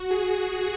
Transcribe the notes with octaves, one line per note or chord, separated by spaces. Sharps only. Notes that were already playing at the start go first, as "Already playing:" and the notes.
Already playing: F#4
G#4